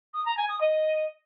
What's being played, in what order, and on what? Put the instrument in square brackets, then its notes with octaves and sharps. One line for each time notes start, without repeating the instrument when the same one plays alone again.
[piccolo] D#6
A#5
G#5
D#6
D#5